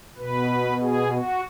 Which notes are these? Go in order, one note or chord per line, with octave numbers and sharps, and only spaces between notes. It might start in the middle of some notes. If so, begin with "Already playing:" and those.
B2 B4
G#4
F#4